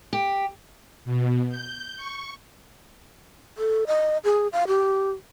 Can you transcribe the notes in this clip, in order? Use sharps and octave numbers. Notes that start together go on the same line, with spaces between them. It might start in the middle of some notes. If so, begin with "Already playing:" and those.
G4
B2
G6
C#6
A4
D#5
G#4
F5
G4